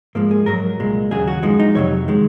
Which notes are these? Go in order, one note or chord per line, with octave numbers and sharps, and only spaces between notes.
G#2 F3 G#3 A#3
G#4
G#2 F#3 A#4
C2 A#2 G#3
D#2 C#3 F#3 G#4
F#4
F#2 F3 G#3 D#4
D#4
F2 C3 F#3 C#5
D#3 G#3